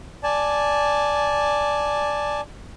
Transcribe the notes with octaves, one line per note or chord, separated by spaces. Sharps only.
D5 G#5 A5